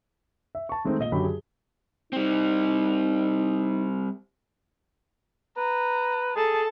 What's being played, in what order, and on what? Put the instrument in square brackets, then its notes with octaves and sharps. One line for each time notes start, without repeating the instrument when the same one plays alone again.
[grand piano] E5
A5 C#6
D#3 G#3 A3 C4 D#4
A#2 D#5 G7
F#2 D3 F#3 G4 B5
G#4
[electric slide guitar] G3 C4 [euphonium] D#4
[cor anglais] B4 [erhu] A#5
[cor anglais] G#4 [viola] A4 A5